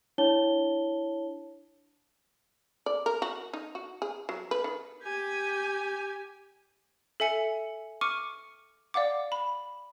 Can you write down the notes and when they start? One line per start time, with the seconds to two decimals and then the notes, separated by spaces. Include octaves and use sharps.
0.18 D4 E4 C#5 A5 G7
2.86 D5
3.06 A#4
3.22 F#4
3.53 D#4
3.75 F#4
4.02 G#4
4.29 F#3
4.51 B4
4.64 D#3
5.02 G4 G#5
7.20 A4 E5 G#5 C#7
8.01 C#6 D6 F6 C#7 D#7
8.94 D5 F5 F#5 D6
9.32 B5